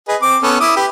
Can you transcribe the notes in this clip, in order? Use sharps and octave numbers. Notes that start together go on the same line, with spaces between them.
G#4 B4 D#5
C4 D6
B3 C#4 A4
E4 D6 D#6
G4 B4